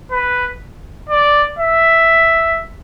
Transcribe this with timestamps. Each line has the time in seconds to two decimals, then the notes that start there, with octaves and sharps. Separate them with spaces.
0.11 B4
1.09 D5
1.59 E5